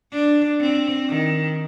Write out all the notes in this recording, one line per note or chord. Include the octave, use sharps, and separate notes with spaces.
D4
C4
D#3